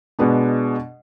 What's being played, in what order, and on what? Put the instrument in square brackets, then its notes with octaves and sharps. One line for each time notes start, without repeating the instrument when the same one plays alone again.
[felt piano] B2 G#3 B3 D4